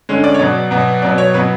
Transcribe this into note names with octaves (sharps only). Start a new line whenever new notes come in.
D3 G#3 C#4
D5
C#5
B2 F#3 B3 D5
B2 F#3 B3
B2 F#3 B3 D5
C#5
B2 F#3 B3 B4